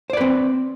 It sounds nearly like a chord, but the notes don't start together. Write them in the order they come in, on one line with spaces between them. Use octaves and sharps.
C5 D5 B4 C4